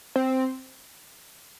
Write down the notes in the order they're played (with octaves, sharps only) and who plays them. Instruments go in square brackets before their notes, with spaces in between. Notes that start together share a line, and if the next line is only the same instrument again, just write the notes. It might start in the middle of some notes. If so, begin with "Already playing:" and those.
[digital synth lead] C4